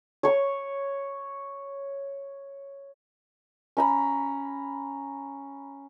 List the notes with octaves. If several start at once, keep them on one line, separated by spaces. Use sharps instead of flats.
C#5 C#6
C#4 A#5 B5